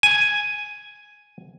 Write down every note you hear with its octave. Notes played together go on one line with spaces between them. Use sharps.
G#5